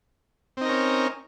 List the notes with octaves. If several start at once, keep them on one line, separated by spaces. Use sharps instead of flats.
C4 C#4 D#4 A#4